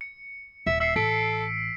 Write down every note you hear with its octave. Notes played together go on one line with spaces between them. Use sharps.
C#7
D#1 E5
E5 E6 C7 C#7
A1 A4 B6 D7